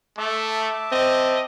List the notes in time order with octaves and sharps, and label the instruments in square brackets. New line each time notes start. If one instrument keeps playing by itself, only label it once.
[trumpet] A3 [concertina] E5 A5 D6
[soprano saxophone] C4 [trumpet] D#5